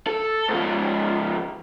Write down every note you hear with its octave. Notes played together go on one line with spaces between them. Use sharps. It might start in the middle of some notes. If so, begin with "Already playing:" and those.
A4
G#2 F3